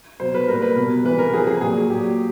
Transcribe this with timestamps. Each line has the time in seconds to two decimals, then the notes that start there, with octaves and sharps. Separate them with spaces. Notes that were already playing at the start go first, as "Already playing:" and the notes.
0.20 B2 F#3 C5
0.34 B4
0.48 A#2 G3 A#4
0.62 B4
0.76 B2 G3
1.04 C3 E3 G3 B4
1.18 A#4
1.33 C3 F3 G#4
1.47 G#4
1.61 A#2 F#3 G#4
1.90 A#2 F#3 G4